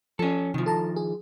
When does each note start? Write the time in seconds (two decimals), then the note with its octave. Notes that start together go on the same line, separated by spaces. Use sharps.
0.19 F3 C#4 A4
0.54 C3 D#3 F3
0.66 A4 A5 A#5
0.96 G#4